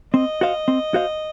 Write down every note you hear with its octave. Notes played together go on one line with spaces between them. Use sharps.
C4 D#5
F#4 C5 F5
C4
F#4 C5 F5